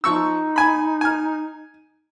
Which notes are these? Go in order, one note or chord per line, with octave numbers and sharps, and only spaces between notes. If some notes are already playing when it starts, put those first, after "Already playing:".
F3 D#4 C#6 E6
G#5 B5
G#5 F6